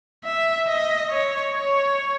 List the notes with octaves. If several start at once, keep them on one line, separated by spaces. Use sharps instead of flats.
E5
D#5
C#5
C#5